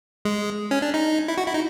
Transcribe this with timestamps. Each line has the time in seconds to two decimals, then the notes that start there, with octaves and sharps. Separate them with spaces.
0.25 G#3
0.71 C#4
0.82 D4
0.94 D#4
1.28 E4
1.38 F#4
1.47 E4
1.54 D#4